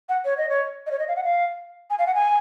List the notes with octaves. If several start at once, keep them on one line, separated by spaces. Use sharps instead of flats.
F#5
C#5
D#5
C#5
D#5
C#5
D#5
F5
F#5
F5
G#5
F5
F#5
G#5